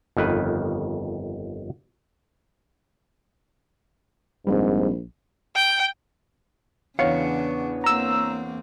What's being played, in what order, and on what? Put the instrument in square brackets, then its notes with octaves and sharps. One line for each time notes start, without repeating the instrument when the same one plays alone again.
[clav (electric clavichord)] G1 F2 D#3 B4
[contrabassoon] A#1 [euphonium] G#2 [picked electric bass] G3 C4
[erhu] G5
[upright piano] E2 C#5 C#7 [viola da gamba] C#3 D4 [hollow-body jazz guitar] B3 F5
[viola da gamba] A#3 C4 [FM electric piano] A#5 E6